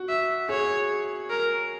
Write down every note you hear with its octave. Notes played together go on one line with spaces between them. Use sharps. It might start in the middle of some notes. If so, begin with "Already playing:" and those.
Already playing: F#4
E5
G#4 C#5
A#4